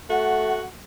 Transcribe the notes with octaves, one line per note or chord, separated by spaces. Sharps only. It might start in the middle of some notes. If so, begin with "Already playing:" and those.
A3 F#4 F#5